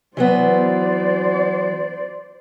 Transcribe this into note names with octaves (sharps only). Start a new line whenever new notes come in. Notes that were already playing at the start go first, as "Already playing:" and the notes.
E3 F#3 B3 C5 D5